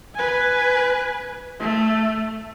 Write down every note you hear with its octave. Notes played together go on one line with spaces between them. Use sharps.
B4 G#5
A3